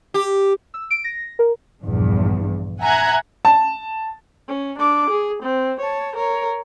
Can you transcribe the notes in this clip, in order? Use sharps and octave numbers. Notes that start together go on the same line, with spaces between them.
G4
E6
D7
A#6
A#4
A#1 E2 G2
E5 F#5 G#5 A#5 F#6 G#6
A5
C#4
D4 D6
G#4
C4
C#5 A5
A#4 C#5